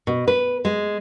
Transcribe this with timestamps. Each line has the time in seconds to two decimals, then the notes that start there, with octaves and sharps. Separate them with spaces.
0.07 B2
0.28 B4
0.65 G#3